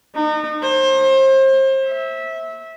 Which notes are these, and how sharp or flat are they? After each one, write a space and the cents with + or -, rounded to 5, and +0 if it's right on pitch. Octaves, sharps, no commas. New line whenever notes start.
D#4 -35
C5 +30
E5 -20